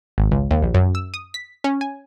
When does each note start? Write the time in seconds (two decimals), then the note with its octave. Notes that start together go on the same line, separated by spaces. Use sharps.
0.18 G#1
0.31 C#2
0.51 D#2
0.63 A#1
0.74 F#2
0.95 E6
1.14 D#6
1.34 B6
1.64 C#4
1.81 G#5